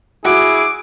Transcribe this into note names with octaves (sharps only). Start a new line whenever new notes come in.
E4 F#4 G#4 D6